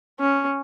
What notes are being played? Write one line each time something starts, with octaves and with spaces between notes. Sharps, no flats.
C#4